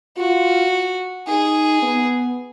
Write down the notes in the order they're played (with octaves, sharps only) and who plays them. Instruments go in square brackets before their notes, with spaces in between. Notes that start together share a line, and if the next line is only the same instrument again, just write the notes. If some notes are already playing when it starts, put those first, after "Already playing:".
[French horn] F4 [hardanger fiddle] F#4
[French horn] D#4 [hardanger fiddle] G#4
[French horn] B3